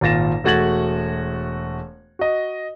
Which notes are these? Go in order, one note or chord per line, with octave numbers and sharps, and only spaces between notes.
G#1 A#2 F4 A6 A#6 E7
E1 A3 F#4 G#6 A6 F#7
F#4 D#5